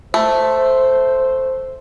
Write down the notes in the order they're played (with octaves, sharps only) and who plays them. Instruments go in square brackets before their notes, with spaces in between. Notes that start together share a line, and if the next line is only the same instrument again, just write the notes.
[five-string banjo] A3 [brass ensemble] C5